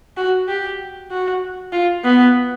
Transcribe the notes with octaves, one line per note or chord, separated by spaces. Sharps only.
F#4
G4
F#4
F4
B3